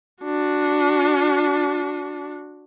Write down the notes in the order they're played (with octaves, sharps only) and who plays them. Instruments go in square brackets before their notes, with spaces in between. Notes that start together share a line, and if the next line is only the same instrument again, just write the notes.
[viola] D4 F#4